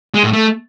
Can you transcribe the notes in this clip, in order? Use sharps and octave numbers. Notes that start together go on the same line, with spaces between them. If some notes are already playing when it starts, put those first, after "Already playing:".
G#3
A2
A3